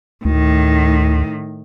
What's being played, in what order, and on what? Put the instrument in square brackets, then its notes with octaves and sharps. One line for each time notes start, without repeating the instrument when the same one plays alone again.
[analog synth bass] D2 [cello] A2 D#3